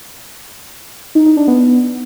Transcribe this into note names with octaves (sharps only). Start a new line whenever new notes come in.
D#4
D#4
D4
B3